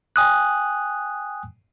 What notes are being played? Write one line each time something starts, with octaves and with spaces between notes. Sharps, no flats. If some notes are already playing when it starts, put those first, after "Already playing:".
G5 G#5 D#6 F#6